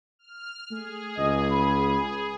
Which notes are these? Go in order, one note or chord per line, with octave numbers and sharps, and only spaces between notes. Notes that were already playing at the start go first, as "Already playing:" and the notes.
F6
A3 G#4
C#2 D#5
B5